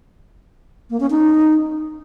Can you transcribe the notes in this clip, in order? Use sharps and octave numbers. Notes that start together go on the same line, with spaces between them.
A#3
C#4
D#4